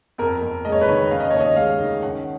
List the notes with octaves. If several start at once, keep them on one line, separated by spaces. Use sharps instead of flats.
F2 A#4
F2
G#3 D#5
C#5
B4
D#3 C#5
C#4 F5
D#5
D#2 C#5
D#5
G#3 F5
D#3
C#4 F#5